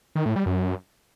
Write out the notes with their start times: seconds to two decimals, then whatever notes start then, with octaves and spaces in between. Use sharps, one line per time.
0.15 D#3
0.26 A2
0.36 G3
0.46 F#2